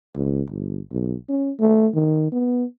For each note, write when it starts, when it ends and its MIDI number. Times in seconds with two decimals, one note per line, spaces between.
0.15 0.42 37
0.50 0.79 31
0.92 1.15 35
1.29 1.51 61
1.60 1.88 57
1.95 2.27 51
2.32 2.65 59